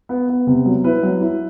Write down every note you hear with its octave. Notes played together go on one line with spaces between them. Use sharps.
B3
B3
C3
F#3
E4 B4
F#3
E4